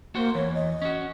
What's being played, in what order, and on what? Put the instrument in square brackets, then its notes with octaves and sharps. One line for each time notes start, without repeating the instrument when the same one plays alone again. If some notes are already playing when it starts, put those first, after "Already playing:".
[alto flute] A#3 [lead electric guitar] F#4 C5
[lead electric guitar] E2 E3 [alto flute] C#5
[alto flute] D#5
[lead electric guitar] C#4 F#4